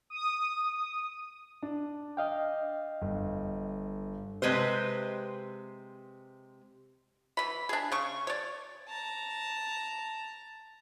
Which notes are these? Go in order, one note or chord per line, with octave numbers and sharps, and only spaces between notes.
D#6
D4
D#5 F5 G5
G1
C3 G#3 B4 C5
E3 B5
D4 G#4
C#3 C#6
C#5 D5
A5 A#5